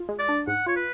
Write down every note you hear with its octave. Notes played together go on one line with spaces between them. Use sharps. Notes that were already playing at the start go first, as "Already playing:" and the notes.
Already playing: F4
G#3
D5
D4
G#2 F#5
F4 C#5
B4